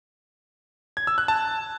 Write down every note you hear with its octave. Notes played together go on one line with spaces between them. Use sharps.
G#6
E6
F#6
A5